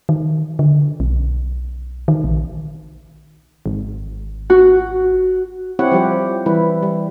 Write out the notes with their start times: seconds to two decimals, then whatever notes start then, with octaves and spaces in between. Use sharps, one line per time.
0.09 D#3
0.59 D3
1.00 B1
2.08 D#3
2.24 A#1
3.66 G#1
4.50 F#4
5.79 C4 E4 G4 C#5 F#5
5.92 F3 G3 G4 C5
6.46 E3 G3 E4 B4
6.83 G3